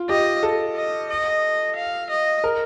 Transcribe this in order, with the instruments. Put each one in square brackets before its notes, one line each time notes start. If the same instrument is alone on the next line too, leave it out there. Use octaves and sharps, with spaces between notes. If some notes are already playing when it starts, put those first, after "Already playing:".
Already playing: [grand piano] F4
[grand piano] G4 [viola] D#5
[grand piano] A4
[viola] D#5
D#5
F5
D#5
[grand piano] A#4